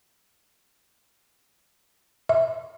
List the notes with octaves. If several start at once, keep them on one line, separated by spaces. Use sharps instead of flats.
E5